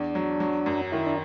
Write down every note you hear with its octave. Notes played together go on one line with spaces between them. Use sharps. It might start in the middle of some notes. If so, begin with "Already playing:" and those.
Already playing: E2 D4
F#3
F#3
F#2
D#3 E4
D4